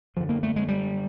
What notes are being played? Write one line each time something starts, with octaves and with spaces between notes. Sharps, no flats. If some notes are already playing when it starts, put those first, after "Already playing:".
F#2 D3 F3
A#3
A3
G#3
G3